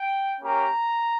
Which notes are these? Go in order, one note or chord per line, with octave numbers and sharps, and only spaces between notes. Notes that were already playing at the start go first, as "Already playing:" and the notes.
Already playing: G5
A#3 C#4 G4 A#5